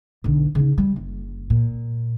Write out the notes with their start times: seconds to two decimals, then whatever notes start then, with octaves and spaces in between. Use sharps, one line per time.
0.24 B1 D3
0.55 C#3 D#4
0.78 G3
0.96 F#1
1.50 A#2